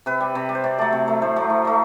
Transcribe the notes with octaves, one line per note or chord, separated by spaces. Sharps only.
C3 B4
G3
C3
G3
C5
C3 D5
F#3 A3 D5
C3
F#3 A3
A2 C5
F#3 A3
A2
F#3 A3